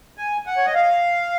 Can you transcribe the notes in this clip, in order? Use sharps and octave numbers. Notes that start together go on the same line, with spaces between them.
G#5
F#5
C#5
D#5
F5